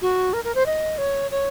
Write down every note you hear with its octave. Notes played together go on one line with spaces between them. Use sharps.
F#4
A#4
A#4
C5
D#5
C#5
C#5